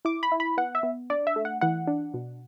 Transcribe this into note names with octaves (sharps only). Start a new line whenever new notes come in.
E4 D6
B5
E4
B5
B3 F#5
E5
B3
D4 D5
E5
A3
F#5
E3 F#5
D4
B2